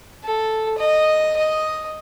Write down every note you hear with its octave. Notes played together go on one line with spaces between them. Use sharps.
A4
D#5
D#5